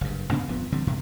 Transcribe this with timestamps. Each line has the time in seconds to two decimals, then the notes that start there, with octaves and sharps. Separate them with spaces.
0.01 F#1 G2
0.31 G2 C#3 B3 D4
0.48 D#1 F2 F3 B3
0.72 D3 E3 G3 C4
0.87 F#2 C3